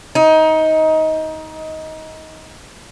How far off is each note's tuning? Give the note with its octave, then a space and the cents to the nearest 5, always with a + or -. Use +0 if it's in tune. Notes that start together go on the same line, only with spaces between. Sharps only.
D#4 +20